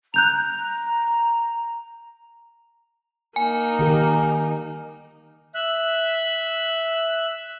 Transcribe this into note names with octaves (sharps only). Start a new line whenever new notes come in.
A#5 F#6 G6 F7
A#3 D#4 G#5
D#3 G4 A#4
E5 F#6